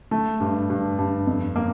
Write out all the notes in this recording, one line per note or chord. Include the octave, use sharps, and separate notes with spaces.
A3
G2
G2
G2
F2
A#3